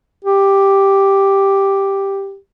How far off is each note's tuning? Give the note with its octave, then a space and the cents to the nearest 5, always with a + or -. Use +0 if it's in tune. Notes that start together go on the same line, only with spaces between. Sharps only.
G4 +0